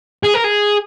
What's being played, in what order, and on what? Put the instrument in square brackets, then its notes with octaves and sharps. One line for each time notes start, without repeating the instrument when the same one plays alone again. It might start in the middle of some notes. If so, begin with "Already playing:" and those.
[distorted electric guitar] G#4
A#4
G#4